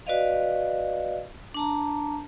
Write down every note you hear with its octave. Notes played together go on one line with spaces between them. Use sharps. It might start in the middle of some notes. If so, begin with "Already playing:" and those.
F#4 B4 D5 D#5 F5
D4 A5 A#5